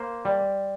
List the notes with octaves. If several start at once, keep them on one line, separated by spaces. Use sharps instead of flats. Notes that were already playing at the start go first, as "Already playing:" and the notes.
Already playing: A#3 C5
G3